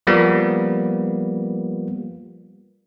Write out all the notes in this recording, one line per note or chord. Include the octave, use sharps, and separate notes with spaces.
F3 G3 A#3 B3